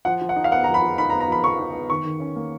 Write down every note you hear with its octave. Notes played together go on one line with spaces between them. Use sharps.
F3 F#5
F3
F#5
D#4
F5
B3 F#5
F3 A#5
B5
F3
D#4 B5
A#5
B3
A#5
F3 B5
F3 C#6
D#4
B3
D#3 C#6
D#3
C#4
A#3